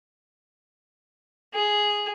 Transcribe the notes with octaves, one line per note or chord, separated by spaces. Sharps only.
G#4